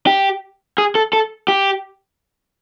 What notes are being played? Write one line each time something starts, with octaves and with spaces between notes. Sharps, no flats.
G4
G#4
A4
A4
G4